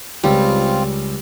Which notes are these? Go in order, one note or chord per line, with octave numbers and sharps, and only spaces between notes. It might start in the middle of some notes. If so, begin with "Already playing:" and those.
C#2 G3 C4 F4